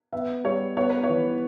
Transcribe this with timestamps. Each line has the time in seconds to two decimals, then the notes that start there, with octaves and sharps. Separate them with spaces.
0.13 B3 E5
0.44 G3 C#5
0.77 B3 C#5
0.90 B4
1.03 C#5
1.09 E3